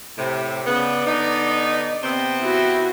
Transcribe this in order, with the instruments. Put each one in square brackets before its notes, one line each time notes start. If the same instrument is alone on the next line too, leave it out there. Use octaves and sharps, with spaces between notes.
[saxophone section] A2 C3
[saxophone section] C#3 B3 [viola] D5
[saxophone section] D3 B3 D#4
C3 B3 C4
[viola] E4 F#4